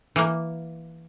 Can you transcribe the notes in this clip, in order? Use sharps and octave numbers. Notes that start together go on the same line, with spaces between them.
E3 A#3